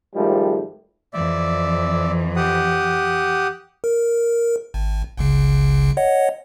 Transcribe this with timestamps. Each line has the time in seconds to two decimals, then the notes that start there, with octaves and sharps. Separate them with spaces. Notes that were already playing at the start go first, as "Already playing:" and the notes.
0.14 G#1 F3 G3 A3
1.13 F2 E3 D5 E5
2.36 G4 F#5 D#6
3.84 A#4
4.74 G#1
5.17 G1 C#2 C#3
5.97 C#5 D#5 F#5